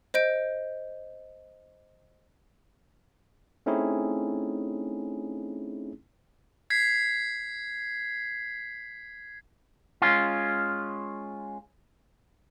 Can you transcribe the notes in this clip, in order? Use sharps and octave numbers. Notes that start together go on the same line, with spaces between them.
C5 D#5 G6 D7
A3 C4 C#4 D#4 E4 G#4
G#6 B6 C7
G#3 C#4 F4